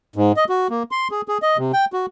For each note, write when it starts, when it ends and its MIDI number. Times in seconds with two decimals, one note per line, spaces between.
0.16 0.32 44
0.37 0.44 75
0.49 0.68 66
0.70 0.83 58
0.91 1.08 84
1.11 1.21 68
1.28 1.38 68
1.42 1.57 75
1.58 1.72 48
1.73 1.85 79
1.93 2.06 66